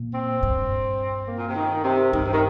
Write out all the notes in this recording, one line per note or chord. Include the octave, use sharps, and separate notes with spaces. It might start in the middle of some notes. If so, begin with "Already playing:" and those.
Already playing: A#2
C4
G2
A#3
A#2
C3
D#3
C3
G2 D#3
C3
D#3